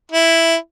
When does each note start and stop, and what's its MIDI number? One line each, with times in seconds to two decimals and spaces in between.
0.12 0.55 64